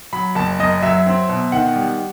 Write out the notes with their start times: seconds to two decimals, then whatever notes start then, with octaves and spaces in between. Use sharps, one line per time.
0.13 F#3 B5
0.35 F#1 A5
0.59 F#2 D#5
0.83 F#3 E5
1.06 C4
1.29 B2
1.52 D#3 F#5
1.76 G3